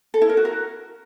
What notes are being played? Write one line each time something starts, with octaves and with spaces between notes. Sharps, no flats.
A4
E4
A#4
F#4
A#4